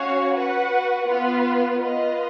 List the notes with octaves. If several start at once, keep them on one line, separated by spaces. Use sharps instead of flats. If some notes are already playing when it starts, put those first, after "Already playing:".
Already playing: C#4 F#4 C#5 F5
F#4 B4 F#5
B3 F4 B4
F4 B4 D#5